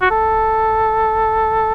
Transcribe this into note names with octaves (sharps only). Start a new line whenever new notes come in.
F#4
A4